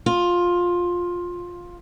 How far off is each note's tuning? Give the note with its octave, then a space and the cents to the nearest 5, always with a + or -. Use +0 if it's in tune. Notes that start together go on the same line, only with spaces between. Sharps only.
F4 +10